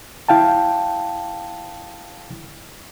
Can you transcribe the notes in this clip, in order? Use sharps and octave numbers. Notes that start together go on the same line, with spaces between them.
E4 F5 G5 A5